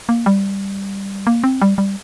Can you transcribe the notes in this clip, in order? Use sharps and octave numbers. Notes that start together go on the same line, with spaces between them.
A#3
G3
A#3
C4
G3
G3